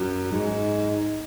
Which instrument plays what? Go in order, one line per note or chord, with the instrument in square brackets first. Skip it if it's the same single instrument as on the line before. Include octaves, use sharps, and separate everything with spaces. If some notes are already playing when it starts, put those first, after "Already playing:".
Already playing: [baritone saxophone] F#2
G#2